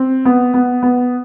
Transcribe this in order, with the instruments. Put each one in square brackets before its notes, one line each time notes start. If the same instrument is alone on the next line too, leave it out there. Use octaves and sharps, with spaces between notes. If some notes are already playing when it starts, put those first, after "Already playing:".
Already playing: [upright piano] C4
B3
B3
B3